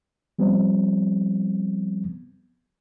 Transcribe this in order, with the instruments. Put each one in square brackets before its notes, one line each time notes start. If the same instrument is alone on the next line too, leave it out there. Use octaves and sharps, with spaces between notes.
[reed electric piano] F3 G3 B3 C4